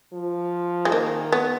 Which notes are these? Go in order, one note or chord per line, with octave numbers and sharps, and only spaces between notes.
F3
G#3
D#3 A#3
B3